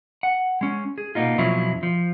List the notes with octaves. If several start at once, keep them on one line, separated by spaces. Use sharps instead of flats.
F#5
G#3 C#4
G#4
B2 A#3 B3 D#4 F4
F2 B2 F3 F#3 C#4 E4
F3